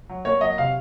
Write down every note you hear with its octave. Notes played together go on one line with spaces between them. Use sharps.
F#3
A#3 C#5
F#3 D#5
C3 F5